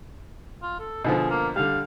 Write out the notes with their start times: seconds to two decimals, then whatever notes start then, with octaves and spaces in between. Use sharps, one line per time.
0.62 F4
0.80 A4
1.04 B2 D3 F3 G#4
1.30 A#3
1.56 D3 G3 F5